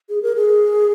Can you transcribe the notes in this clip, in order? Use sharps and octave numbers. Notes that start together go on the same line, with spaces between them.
G#4
A#4
G#4